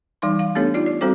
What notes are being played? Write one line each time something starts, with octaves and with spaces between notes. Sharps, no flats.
E3 G3 D#4 C6
F5
A3 B3 D4 G4 A4 C#5
D#4 F4 G4 D5
D5
G3 C4 F#4 A4 C5 D6